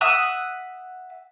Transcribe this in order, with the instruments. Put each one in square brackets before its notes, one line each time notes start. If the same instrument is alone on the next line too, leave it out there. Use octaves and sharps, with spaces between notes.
[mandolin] E5 F#5 D#6 E6